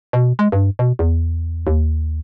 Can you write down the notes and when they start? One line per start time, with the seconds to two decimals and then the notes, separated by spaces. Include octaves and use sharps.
0.13 B2
0.39 G#3
0.52 G2
0.79 B2
0.99 E2
1.67 D#2